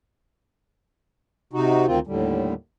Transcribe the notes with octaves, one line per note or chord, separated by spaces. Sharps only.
C3 D#4 F#4
D2 D#3 C4 F4
D#2 A2 D3 G3